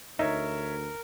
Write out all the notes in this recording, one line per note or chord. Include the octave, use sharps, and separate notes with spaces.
D2 D#4 A#4 C#5 E5